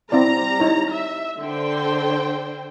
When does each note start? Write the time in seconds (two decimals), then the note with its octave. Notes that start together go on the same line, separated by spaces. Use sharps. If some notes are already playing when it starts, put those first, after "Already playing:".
0.12 G3 C4 E4 D5 A#5
0.60 D#4 E4 C#5
0.92 E5
1.38 D3 C5 G5